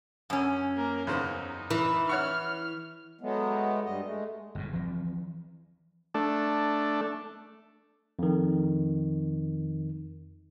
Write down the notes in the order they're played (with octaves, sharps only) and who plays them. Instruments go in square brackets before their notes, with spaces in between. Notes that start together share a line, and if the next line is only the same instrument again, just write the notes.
[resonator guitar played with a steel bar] F#2 C#4
[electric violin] A#3 A#4
[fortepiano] E2 C#3 C5 [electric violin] D#4
[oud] E3
[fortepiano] C#5 F#5 C#6 [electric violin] F6
[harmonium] F#3 G#3 A3 B3
G2 G3 D#5
G#3 A3
[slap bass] G1 F#2 A2
E3 F3 C4
[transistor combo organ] A3 D4
[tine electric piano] F2 D#3